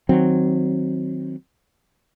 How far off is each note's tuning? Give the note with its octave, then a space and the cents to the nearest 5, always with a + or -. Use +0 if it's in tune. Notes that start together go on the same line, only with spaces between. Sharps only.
D#3 +0 F#3 +0 C4 +0